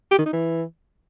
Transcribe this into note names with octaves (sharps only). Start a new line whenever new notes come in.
G4
D#3
D#4
E3